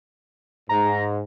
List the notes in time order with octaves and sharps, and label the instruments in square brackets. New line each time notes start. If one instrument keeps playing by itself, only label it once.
[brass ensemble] G#2 [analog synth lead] A#5